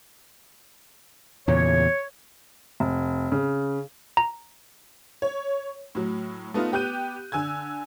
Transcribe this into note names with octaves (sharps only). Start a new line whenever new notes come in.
E2 A#2 C#3 C#5
F1
C#3
A#5
C#5
A2 F#3
A3 B3 D#4 F4
B3 G4 F#6 G6 D#7
D3 G#5 E6 G#6